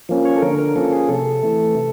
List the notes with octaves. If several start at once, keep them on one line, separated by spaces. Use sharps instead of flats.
F3 A#3 C#4
C#5
A4
D3 A#4
A#4
F3 A#3 C#4 A4
G#4
C3 A4
E3 A3
C3